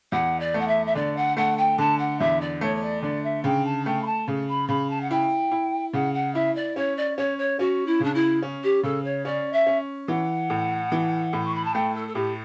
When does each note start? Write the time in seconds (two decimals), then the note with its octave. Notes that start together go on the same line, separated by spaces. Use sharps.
0.12 E2 F#5
0.40 D5
0.54 A3
0.59 F#5
0.68 E5
0.86 E5
0.95 D3 D5
1.16 F#5
1.37 A3 F#5
1.58 G5
1.78 D3 A5
1.99 F#5
2.20 E2 E5
2.41 D5
2.61 A3 C#5
2.76 C#5
2.82 D5
3.02 D3 D5
3.23 E5
3.44 C#3 G5
3.65 A5
3.86 A3 G5
4.02 B5
4.06 A5
4.28 C#3
4.49 B5
4.69 C#3 B5
4.90 A5
5.01 F#5
5.11 E4 G5
5.51 E4
5.93 C#3 F#5
6.14 F#5
6.34 E4 E5
6.55 D5
6.76 C#4 C#5
6.97 D5
7.17 C#4 C#5
7.38 C#5
7.59 C#4 F#4
7.86 E4
8.00 C#3 D4
8.14 E4
8.43 C#4
8.63 G4
8.83 C#3 A4
9.04 C#5
9.25 C#4 D5
9.53 E5
9.67 C#4
10.08 E3 F#5
10.50 A2
10.92 E3
11.33 A2
11.45 C#6
11.55 B5
11.64 A5
11.74 A3 G5
11.94 A4
12.08 A4
12.15 A2 G4